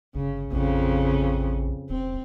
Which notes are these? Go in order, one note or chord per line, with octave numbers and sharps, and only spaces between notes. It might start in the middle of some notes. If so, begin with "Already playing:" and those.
G1 C#3
A1 F2 C#3
E1 C4